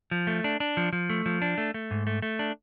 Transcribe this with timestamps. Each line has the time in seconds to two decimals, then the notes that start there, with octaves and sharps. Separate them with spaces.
0.11 F3
0.27 A3
0.44 D4
0.60 D4
0.77 F3
0.93 F3
1.10 A3
1.26 F3
1.42 D4
1.58 A3
1.74 A3
1.91 G#2
2.07 A3
2.22 A3
2.39 D4